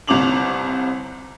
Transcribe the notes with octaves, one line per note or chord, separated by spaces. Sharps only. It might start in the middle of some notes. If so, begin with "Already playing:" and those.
G1 C2 C3 D6 F7 F#7